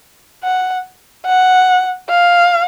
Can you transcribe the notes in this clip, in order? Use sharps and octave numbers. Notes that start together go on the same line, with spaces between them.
F#5
F#5
F5